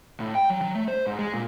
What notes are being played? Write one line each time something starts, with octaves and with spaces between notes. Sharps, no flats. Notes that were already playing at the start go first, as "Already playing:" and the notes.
A2
G5
F#3
F#3
A3
C5
G#2
G#3
A#2